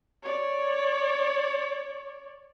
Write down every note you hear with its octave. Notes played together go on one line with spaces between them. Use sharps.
C#5 D5